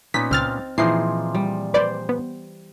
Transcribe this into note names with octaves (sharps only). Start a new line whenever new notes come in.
A#2 B3 C#4 D#4 B6
C#2 C4 F6 A6
A#2 E3 F3 D#4 G#4 C7
G3
B4 C5 D5 G5
B3